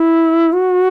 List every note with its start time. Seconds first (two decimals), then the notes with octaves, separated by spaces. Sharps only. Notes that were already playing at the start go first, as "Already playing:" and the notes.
Already playing: E4
0.53 F#4